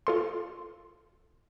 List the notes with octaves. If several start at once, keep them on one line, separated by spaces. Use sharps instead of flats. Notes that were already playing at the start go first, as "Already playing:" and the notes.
F4 A4 C6